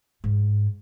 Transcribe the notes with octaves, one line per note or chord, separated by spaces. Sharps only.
G#2